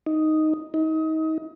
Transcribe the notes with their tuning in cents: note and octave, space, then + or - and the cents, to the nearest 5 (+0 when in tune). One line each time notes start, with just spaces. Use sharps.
D#4 +0
D#4 +30